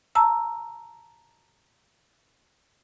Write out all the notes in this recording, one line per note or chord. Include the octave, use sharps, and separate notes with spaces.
A5 A#5 E6